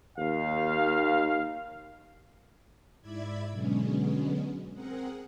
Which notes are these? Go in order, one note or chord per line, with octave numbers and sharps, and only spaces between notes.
D#2 F5
G#2 E4 D5 E5 B5 G#6
B2 D3 F#3 G#3 B3 C#4
C4 G#4 A#4 F#5